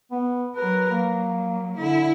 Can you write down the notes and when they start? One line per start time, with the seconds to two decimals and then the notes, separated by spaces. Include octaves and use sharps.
0.12 B3
0.56 F#3 A#4 B4
0.91 F#3 A#3
1.77 D3 E4